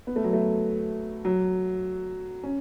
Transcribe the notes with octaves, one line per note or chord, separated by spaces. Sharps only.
B3
A3
F#3
A3
F#3
C#4